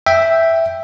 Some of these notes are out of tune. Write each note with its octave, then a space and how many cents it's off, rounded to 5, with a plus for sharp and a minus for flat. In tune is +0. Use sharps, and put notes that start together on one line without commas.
E5 +0 G5 +0